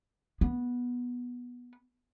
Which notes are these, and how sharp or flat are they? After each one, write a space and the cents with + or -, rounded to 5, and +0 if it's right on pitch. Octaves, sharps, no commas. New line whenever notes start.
B3 -10